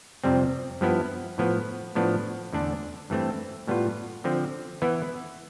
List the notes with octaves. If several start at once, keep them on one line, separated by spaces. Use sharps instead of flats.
F2 C3 G3 C4
G2 F3 B3 E4
A2 F3 B3
A2 F3 B3 D4
E2 D3 A3 D4
G2 E3 A3 C4
A2 G3 B3 F4
D3 F3 C4
E3 B3 E4